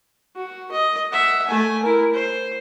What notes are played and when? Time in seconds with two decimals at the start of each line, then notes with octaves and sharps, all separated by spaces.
0.36 F#4
0.72 D#5
1.13 E5 F#5
1.47 A3 G#5
1.83 E4 A#4
2.14 C5